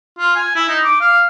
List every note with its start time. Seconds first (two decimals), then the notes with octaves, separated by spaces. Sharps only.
0.19 F4
0.36 G#5
0.56 E4
0.69 D#4
0.84 D6
1.01 F5